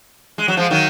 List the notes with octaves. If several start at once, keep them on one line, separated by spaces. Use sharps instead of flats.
G#3
F#3
F3 G#3
D#3 F#3